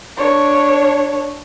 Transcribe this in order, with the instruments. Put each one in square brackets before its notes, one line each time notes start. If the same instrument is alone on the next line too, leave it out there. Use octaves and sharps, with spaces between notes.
[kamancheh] D4 C#5